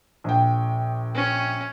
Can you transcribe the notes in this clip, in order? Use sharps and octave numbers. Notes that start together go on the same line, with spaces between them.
A#1 G5
C#4